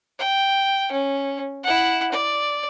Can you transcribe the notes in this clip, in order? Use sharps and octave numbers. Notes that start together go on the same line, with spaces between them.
G5
C#4
E4 F#5
D5